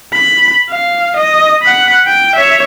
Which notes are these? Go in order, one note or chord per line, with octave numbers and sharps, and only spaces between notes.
B5
F5
D#5
F#5 B5
G5
C#5 E5